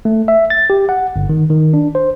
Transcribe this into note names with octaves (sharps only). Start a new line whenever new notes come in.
A3
E5
A6
G4
F#5
G1
D#3
D#3
D4
C5